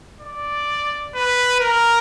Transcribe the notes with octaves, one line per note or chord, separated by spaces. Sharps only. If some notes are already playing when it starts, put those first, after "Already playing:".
D5
B4
A#4